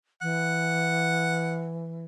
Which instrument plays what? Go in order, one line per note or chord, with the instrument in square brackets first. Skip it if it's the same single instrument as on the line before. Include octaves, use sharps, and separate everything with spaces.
[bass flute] E3 [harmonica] F#5